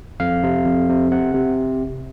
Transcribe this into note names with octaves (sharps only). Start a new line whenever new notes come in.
F2 F5
C3
F2
C3
C3 F#5
C3